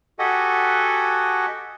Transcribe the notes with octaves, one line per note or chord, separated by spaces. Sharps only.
F#4 G4 A4 D#5 F#5 G#5